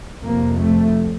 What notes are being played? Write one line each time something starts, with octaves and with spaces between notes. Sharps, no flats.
F2 C3 A#3
A3